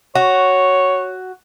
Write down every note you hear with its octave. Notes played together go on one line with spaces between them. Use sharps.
F#4 C#5